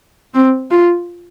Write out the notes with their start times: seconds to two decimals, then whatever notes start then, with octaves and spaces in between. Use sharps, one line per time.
0.34 C4
0.71 F4